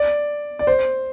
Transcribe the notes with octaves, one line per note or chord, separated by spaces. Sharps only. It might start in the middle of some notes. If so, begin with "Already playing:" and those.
Already playing: D5
D5
C5